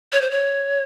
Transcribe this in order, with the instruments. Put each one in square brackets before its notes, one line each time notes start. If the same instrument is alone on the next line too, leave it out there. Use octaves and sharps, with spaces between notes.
[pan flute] C#5
C5
C#5